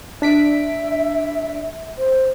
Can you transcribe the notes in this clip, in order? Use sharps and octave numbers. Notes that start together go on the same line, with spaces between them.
D4 E5 B6 D7
C5